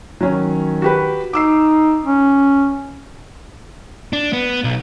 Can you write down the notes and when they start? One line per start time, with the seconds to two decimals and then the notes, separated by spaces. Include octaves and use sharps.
0.21 D#3 F#3 C#4
0.82 F#4 G4 B4
1.33 D#4 D6 E6 C7
2.04 C#4
4.13 D4
4.33 B3
4.64 B1